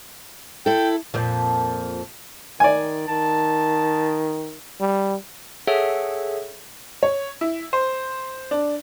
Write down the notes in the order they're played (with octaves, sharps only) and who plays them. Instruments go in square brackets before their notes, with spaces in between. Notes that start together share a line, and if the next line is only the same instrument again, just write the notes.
[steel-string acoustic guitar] E4 A4 [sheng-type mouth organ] G5
[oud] F2 A#2 F3
[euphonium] D#3 [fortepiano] D5 G#5
[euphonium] D#3 [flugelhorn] A5
[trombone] G3
[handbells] G#4 A4 C#5 E5 F#5
[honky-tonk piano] C#5
E4
C5
D4